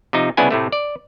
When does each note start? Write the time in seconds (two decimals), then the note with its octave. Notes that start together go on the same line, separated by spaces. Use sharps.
0.13 C3 F3 D#4
0.37 C2 C#3 B3 D4 E4 G#5
0.51 A2 C3 A3
0.72 D5